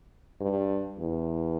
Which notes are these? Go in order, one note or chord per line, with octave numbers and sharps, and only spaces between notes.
G2
E2